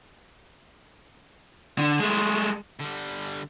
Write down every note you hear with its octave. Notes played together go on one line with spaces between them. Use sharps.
D3
G#3 A3
D3 G3